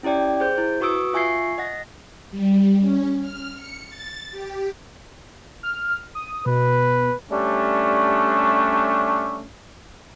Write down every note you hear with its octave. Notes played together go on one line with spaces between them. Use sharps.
C#4 E4 G4 D5 G5
G#4 C5 G6
E4
F#4 B4 C#6 D#6 E6 D7
F4 E5 G#5 C#6 G#6 C7
D#5 F#5 A#6
G3
C#4
F6
C#7
A6
G4
F6
D#6
B2 B4
G3 A3 C#4 D4